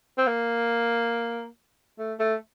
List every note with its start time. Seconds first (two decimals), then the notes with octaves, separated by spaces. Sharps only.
0.18 C4
0.27 A#3
1.99 A3
2.20 A3